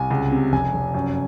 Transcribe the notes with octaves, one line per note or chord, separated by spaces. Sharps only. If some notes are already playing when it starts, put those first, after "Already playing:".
Already playing: C2 G#5
C#2
C3
F1 G#5
F1
F#2